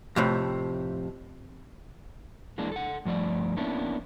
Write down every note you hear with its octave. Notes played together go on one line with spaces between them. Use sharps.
F2 A2 C3
E3 G#3 A#3 D4
A4 F#5
G2 F3 A3 D5
A#3 B3 C#4 D4 E4